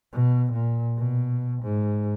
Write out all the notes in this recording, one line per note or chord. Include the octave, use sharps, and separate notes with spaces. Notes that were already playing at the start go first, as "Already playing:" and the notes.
B2
A#2
B2
G#2